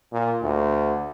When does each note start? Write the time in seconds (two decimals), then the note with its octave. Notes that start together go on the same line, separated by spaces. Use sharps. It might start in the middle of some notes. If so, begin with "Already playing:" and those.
0.12 A#2
0.42 D2